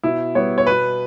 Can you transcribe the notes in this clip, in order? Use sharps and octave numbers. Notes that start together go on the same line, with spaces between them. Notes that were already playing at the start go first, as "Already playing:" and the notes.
B2 E4
G3 B3 C#5
C#5
B2 B4